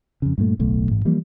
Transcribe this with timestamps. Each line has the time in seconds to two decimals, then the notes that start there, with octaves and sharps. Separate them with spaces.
0.22 F2 C#3
0.38 G2 A#2 A3
0.59 D1 B1 A3
0.90 A1 G#2
1.05 E3 F3 G3 A#3